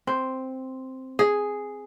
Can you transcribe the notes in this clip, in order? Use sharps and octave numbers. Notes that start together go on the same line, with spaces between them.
C4
G#4